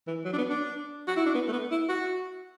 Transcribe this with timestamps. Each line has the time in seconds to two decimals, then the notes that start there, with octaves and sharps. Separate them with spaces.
0.07 E3
0.25 F#3
0.33 D4
0.38 B3
0.50 D4
1.08 F#4
1.16 E4
1.26 D4
1.35 B3
1.48 A3
1.52 B3
1.71 E4
1.89 F#4